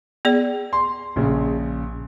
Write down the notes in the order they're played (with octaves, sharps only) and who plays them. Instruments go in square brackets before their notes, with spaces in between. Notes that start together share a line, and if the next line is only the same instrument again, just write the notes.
[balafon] B3 G#4 D5
[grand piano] C6
A#1 C#3